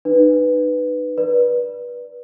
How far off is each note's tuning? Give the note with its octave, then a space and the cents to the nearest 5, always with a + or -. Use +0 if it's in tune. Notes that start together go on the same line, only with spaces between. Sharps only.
D#4 -35 B4 +5
B4 -20 D5 +0